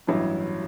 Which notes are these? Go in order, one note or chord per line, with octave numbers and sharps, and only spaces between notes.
A1 G2 F#3 E4